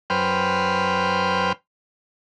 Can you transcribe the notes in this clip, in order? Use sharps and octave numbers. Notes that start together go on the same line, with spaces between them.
F#2 B4 C5 G5 F6